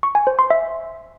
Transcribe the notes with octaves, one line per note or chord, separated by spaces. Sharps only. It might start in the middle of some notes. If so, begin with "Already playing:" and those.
C#6
G#5
C5
C6
E5